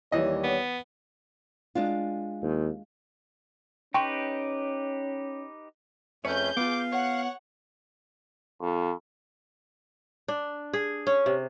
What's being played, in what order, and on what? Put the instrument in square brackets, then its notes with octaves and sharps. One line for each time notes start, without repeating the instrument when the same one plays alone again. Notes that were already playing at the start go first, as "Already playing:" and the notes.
[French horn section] D#2 G3 C#5 [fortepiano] E3 D#5
[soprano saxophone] B3
[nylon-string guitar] G#3 D4 F4
[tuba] D#2
[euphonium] C#4 [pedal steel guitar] D#4 G4 B4 [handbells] G5 C6 C#6
[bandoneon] F2 A3 C#4 [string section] G#4 G6 [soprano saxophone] B4 [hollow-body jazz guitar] C#5
[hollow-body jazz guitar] B3 F4 [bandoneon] F5 [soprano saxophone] D6
[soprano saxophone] C#5 [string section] F#5
[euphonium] F2
[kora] D4
G#4
C#4
C3